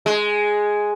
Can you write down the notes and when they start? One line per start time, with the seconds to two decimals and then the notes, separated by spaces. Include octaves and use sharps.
0.06 G#3